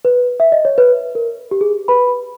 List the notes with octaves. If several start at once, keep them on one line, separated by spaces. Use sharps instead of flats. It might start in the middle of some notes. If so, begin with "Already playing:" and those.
B4
E5
D#5
C#5
B4
A#4
G4
G#4
B4 B5